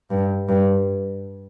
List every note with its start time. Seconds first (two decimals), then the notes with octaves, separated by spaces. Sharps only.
0.11 G2
0.49 G2